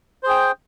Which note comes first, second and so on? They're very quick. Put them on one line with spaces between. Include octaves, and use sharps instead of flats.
C5 G#4 G5